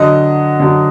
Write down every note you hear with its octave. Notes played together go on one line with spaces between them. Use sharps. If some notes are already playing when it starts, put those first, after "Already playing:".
Already playing: D3 F#3 D#5
D3 F#3